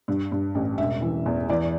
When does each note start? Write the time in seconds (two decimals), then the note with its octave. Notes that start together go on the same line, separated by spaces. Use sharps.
0.08 G2
0.32 G2
0.55 A1
0.78 E1 E5
1.02 E3
1.26 E2
1.49 E3 D5